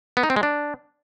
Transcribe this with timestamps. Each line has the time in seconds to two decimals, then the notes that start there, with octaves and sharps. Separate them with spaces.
0.17 B3
0.23 D#4
0.30 C4
0.36 G#3
0.43 D4